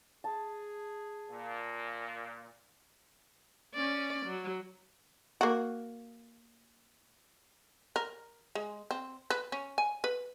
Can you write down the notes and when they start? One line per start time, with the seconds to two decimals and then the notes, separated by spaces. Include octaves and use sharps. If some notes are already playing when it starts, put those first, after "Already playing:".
0.24 G#4 A5
1.30 A#2
3.75 C#4 D5
4.26 F#3
5.41 A#3 F#4
7.96 A#4
8.55 G#3
8.91 C4
9.30 B4
9.52 C#4
9.78 G#5
10.04 B4